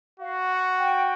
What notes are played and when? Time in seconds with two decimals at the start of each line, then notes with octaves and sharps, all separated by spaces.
0.19 F#4 F5
0.49 F#5
0.77 G5